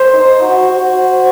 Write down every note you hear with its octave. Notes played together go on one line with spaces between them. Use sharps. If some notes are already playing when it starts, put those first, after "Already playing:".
Already playing: C5
D#4
F#4
F#4